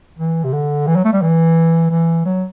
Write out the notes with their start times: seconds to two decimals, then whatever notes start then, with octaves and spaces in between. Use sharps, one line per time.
0.18 E3
0.44 C3
0.53 D3
0.87 E3
0.96 F#3
1.05 A3
1.13 G3
1.22 E3
1.91 E3
2.25 F#3